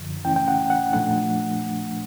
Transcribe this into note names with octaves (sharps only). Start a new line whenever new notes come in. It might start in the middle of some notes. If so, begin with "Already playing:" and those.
Already playing: F#2 D3 F3
C#3 E3 A3 C#4 E4 G5
G5
F#5
F#5
A#2 F3 A3 D4 F#5